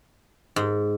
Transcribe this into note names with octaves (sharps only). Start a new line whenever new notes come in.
G#2